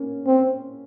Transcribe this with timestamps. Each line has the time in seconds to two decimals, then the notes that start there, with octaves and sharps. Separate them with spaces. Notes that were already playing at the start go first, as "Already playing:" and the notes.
Already playing: A#3 C#4
0.27 C4